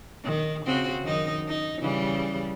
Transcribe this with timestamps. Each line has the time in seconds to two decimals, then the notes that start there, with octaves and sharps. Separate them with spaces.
0.24 D#3
0.66 C#3 C4 F#4
1.03 F#2 D#3 D#4
1.48 D#4
1.81 C#3 E3 G3